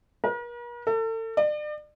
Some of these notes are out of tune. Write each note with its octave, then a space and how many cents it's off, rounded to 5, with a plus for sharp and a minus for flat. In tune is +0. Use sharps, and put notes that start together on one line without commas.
A#4 +45
A4 +35
D5 +40